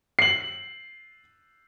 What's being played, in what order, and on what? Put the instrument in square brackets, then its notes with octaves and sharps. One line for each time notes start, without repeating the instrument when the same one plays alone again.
[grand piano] C7 F#7